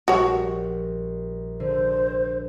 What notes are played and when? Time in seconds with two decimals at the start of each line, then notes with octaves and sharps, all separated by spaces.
0.08 A#1 G3 F#4 C#5
1.60 D3 C5